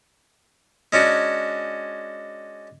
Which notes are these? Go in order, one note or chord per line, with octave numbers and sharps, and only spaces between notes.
G#3 C#4 D4 F#4